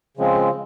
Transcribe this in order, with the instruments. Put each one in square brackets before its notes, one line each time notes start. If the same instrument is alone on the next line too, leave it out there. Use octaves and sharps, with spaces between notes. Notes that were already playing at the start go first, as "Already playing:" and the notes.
[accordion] C#3 F3 G#3 C4